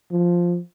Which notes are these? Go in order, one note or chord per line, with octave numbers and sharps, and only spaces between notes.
F3